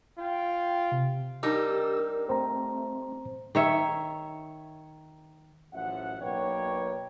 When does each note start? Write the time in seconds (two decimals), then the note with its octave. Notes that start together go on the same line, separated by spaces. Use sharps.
0.19 F4 G5
0.92 C3
1.43 G3 D4 D#4 G4 A#4 E6
2.29 A3 C4 C5 A#5
3.55 D#3 C#5 E5
5.73 A1 F#2 F3 E5 F#5
6.20 B1 A#3 D4 B4 C#5 G5